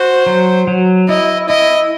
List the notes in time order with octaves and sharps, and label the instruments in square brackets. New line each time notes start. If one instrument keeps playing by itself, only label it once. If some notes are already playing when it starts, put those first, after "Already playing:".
Already playing: [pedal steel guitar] F#4 [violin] C5
[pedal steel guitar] F#3
F#3
[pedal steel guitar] E4 [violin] D#5
[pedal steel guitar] E4 [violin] D#5